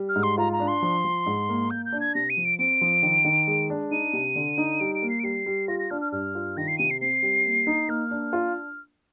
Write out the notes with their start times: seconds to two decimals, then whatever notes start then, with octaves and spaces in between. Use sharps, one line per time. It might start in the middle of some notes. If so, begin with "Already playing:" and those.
Already playing: G3
0.09 F6
0.16 G#2
0.23 C6
0.38 F4 A#5
0.53 A#5
0.60 D4
0.68 C6
0.82 F3
1.05 F3
1.26 G#2
1.49 A#3
1.70 A#3 G6
1.85 G6
1.92 D4
2.00 G#6
2.15 C3 A#6
2.30 D#7
2.37 F3
2.44 D7
2.59 C4 D7
2.81 F3
3.03 D#3
3.25 D#3
3.47 G#3
3.70 D4
3.91 D#4 D#7
4.13 C3
4.36 D3
4.58 D#4
4.80 G3 D7
4.95 D7
5.02 A#3
5.09 C7
5.19 D7
5.23 G3 C7
5.46 G3
5.68 F4 A#6
5.79 A#6
5.90 D4 F6
6.01 F6
6.12 G2 F6
6.35 F4
6.57 D#3 A#6
6.68 C7
6.78 C3 D#7
6.90 C7
7.01 C4 C7
7.23 G3
7.46 A#3
7.67 D#4
7.89 A#3 F6
8.11 D4
8.33 F4